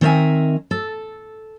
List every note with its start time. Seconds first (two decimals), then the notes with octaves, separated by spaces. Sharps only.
0.01 D#3 C4 A#4 C#5 E5 G#5
0.71 A4